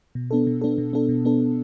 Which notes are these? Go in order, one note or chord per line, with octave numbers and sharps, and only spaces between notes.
B2
B3 D4 A4
B2
B3 D4 A4
B2
B3 D4 A4
B2
B3 D4 A4